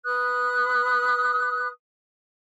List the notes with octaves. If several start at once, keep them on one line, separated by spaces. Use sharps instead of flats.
B4 D#6 F#6